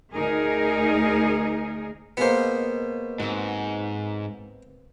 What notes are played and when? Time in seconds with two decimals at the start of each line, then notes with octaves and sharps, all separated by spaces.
0.14 D2 D#4 G#4 A#4
2.17 B2 G#3 A#3 B3 C5
3.20 G#2 C4 F#4